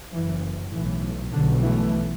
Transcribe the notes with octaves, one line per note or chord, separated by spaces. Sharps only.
F#1 F#2 E3
B1 A2 E3
B1 B2 D3
E3 A3